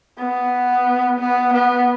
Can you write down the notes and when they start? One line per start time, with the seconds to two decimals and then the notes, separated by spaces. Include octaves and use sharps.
0.19 B3
1.19 B3
1.53 B3